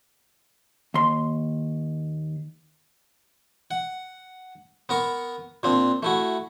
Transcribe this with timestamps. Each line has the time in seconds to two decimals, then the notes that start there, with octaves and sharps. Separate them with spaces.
0.94 D#2 C6
3.71 F#5
4.89 B3 A#4 C#6
5.63 A#2 C4 D4
6.03 A3 E4 F#4